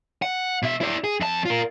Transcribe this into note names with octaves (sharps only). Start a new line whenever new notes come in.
F#5
B2 E5
E4 D5
G#4
F2 A5
F4 A#4